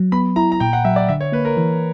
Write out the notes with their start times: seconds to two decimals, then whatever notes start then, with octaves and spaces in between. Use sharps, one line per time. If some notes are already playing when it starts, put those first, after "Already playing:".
Already playing: F#3
0.12 B3 B5
0.36 E4 A#5
0.52 A#5
0.60 A#2 G5
0.73 F#5
0.85 F#3 E5
0.96 D5
1.08 D3 E5
1.20 C#5
1.32 A#3 B4
1.45 A#4
1.57 E3